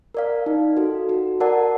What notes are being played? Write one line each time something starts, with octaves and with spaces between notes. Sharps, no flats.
A#4 D5 F5
D#4
F#4 A4
F#4
A#4 D5 F#5 A5